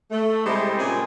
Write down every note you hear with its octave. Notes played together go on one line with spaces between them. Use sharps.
A3
C3 G3 G#3 E4 G#4 C5
A#2 C#3 C4 G#4